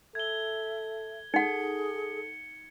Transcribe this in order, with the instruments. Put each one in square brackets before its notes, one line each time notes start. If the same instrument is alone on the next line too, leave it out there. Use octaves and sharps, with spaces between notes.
[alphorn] A4 [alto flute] E5 [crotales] G#6 G7
[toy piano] D#4 F#5 [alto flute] G#4 [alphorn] A4 [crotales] C#7